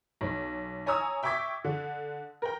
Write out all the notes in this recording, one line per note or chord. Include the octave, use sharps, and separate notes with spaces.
B1
C#5 G#5 A#5 D#6 E6
E5 G5 C#6 D6 G#6 B6
D3
A#4 G5